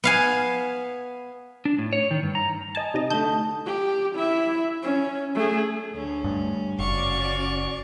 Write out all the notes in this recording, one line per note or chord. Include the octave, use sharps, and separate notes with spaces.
B3 F5 G#5
D4
A2
C#5
D#3
G2
A#5
D#5 G#5 A5
C3 D#4 D#5
D3 A3 A5 D#6 G6
G4
E4 E5
C#4
A3 G#4
D2 C#4
G2
F#1 C#4 F#4 D5 F5 C#6